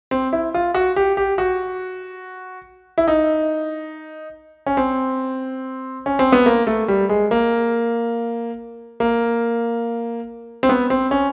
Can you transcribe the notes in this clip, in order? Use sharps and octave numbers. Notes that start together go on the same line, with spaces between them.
C4
E4
F4
F#4
G4
G4
F#4
E4
D#4
C#4
C4
C#4
C4
B3
A#3
A3
G3
G#3
A#3
A#3
C4
B3
C4
C#4